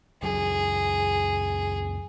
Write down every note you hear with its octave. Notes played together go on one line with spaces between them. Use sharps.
C#2 F#2 F#3 G#4